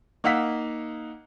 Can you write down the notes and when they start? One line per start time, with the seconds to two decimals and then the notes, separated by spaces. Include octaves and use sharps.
0.24 A#3 D#4 F5 F#5 E6 B6